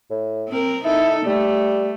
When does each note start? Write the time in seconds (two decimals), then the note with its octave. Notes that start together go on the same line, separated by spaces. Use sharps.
0.11 A2
0.49 C4 A#4
0.85 D#4 E4 A4
1.26 G3 A3